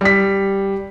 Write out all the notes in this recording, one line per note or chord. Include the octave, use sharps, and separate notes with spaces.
G3 B6